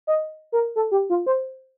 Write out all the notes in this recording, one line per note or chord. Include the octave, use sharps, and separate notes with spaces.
D#5
A#4
A4
G4
F4
C5